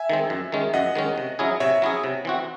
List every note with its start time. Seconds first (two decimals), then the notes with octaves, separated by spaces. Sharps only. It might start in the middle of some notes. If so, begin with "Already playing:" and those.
Already playing: E5 G#5
0.10 D#3 G#3 C4
0.30 F#2
0.52 D#3 G#3 C#4
0.74 F#2 D#5 F#5
0.95 D#3 G#3 C#4
1.18 C3
1.39 F#3 C#4 E4 G#4
1.60 C3 C#5 E5
1.82 F#3 C#4 E4 G#4
2.04 C3
2.25 E3 C4 F#4